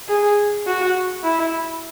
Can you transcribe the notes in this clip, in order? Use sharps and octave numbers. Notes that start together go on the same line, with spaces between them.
G#4
F#4
E4